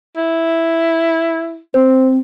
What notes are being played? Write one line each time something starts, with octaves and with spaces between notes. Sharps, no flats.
E4
C4 C5